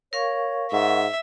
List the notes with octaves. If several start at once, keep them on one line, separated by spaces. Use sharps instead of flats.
A#4 C#5 F5 C#6
G#2 E5 F#5